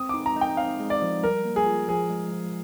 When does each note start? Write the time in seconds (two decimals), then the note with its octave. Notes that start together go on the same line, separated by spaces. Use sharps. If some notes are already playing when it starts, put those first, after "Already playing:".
Already playing: C4 D#6
0.09 D#4 D6
0.26 A#5
0.36 D#4
0.41 G5
0.57 C4 F5
0.80 G#3
0.90 D5
1.02 F3
1.23 G3 A#4
1.45 A#3
1.56 G#4
1.66 F4
1.88 F3 G#4
2.10 G#3
2.32 F3